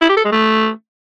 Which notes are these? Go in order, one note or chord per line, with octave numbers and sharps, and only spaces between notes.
E4
G4
A4
G#3
A3